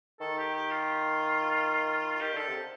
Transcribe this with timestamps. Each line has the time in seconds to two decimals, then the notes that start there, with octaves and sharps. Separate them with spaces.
0.20 D#3 A4
0.38 G4
0.54 G4
0.71 F4
2.15 F4
2.21 D#3 G4
2.34 D3 A4
2.47 C3